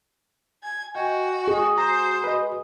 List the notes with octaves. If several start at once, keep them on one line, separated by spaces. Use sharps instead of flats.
G#5 G#6
F#4 D#5 G5 G#5
G#4
F#4 C5 A#5
B4 D#5